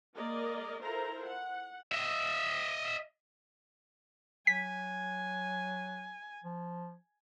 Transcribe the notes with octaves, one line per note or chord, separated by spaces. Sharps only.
G#3 A#3 A#4 D5 D#5
E4 F4 A4 A#4 C5 A#5
F#5
D#5 E5
F#3 G#5 B6
F3